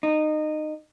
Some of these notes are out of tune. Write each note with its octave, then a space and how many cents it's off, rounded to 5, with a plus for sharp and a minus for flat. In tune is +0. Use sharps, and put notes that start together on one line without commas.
D#4 -20